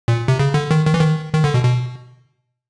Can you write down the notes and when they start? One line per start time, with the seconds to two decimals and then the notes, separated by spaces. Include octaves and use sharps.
0.08 A#2
0.28 C3
0.39 C#3
0.54 D3
0.71 D#3
0.87 D#3
0.94 E3
1.01 D#3
1.34 D#3
1.44 D3
1.54 B2
1.65 B2